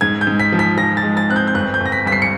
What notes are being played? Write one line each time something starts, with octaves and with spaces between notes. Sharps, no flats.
G#2 G#6
G6
G#2
B6
F3
B6
F3 A#6
A6
G#3
A6
C4 F#6
G6
G6
G1 F#6
G6
G1
A#6
B6
G2 B6
C7
C#7